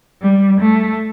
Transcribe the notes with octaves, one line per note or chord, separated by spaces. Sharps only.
G3
A3